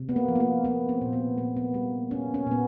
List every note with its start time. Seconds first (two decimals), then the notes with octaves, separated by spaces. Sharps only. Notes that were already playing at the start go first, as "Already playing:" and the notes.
Already playing: C3
0.09 B3
0.16 A#3
0.28 F3
0.35 B3
0.40 A#3
0.64 A#3 B3
0.89 C4
1.01 A#2
1.13 B3
1.38 A#2 A#3
1.57 B3
1.74 G3 A#3
2.11 A#3 C#4
2.34 C#4
2.47 A#2 B3